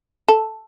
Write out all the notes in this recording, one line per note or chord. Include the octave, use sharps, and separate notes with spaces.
A4